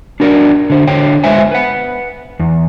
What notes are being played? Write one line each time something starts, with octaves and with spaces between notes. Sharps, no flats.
D4 F#4 A#4 B4 D5
D3 C5
D3 C#5 G5
G#3 B4 C5 E5 G#5
B4 F#5
E2